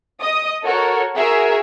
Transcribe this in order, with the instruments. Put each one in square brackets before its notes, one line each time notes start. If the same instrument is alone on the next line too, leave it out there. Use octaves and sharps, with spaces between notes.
[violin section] D#5 D#6
F#4 A4 A#4 C#5
F#4 G#4 A#4 E5